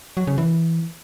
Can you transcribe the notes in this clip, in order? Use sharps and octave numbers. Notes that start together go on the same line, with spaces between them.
F#3
C#3
E3